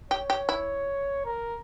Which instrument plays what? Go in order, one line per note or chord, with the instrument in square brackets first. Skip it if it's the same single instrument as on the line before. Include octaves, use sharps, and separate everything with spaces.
[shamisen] G4 [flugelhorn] C#5
[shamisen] G4
E4
[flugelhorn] A#4